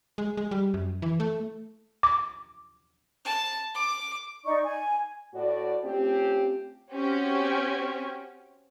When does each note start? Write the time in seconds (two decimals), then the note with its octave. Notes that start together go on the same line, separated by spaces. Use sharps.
0.18 G#3
0.37 G#3
0.51 G3
0.74 F#2
1.02 E3
1.20 A3
2.03 D6
3.25 A5
3.74 D6
4.45 D#4 D5 C#6
4.64 G#5
5.34 A2 F#4 D5
5.84 A3 C4 C#4 F4 G4
6.92 C4 C#4 F#4 G4 C#5